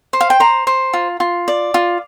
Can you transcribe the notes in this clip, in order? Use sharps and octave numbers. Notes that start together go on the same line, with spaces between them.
C5
F5
G5
C5 A#5
C5
F4
F4
D5
F4